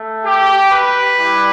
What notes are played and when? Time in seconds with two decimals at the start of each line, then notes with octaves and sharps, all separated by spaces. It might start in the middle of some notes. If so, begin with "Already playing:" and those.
Already playing: A3
0.26 G4
0.72 B4
1.18 G3 E4 G4